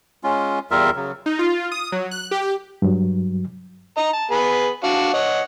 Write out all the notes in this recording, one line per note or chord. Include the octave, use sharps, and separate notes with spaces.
G#3 C#4 F4
E2 G3 F4 A#4 E5
C#3 F#3
D#4
F4
D#6
F#3
F#6
G4
G2 F#3
D#5 A#5
A5
B3 G#4 B5
D4 F#4 F5
C#5 D#5 F#5